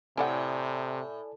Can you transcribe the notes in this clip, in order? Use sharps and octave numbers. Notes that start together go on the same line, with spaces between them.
A2 C3 E4 A4 D5 F#5 G#5